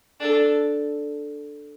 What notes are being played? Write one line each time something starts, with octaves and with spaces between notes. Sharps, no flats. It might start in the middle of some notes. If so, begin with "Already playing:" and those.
D4 A4